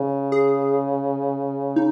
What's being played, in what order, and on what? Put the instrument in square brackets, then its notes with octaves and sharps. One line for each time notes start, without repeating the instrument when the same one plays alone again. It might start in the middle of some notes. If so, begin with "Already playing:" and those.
Already playing: [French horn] C#3
[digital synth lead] G#4
D#4